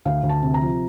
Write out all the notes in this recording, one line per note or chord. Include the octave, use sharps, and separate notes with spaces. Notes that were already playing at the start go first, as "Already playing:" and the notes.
D2 F5
D2
A5
C3
A#5
F3